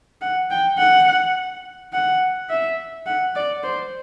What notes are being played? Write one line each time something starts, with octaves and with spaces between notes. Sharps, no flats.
F#5
G5
F#5
F#5
E5
F#5
D5
C5